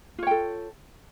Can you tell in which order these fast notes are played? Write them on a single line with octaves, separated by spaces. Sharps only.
F4 C#5 G5 A4